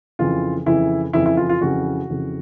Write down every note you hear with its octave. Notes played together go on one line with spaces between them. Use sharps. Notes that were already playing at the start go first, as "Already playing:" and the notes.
F2 C#3 E3 F4
F2 C#3 E3 E4
F2 C#3 E3 E4
E4
F4
F4
F2 C#3 E3 F#4
F2 C#3 E3